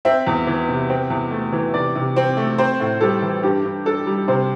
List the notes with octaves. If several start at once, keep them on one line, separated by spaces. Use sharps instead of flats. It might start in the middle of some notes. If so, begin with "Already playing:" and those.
C4 E5
E2
E3
C3
C4
E2
A3
E3
C3 D5
C3
C4
A3
C4 C5
A2
G3 A4
E3
G2 G4
G2
D4 A4
G3
C3 C5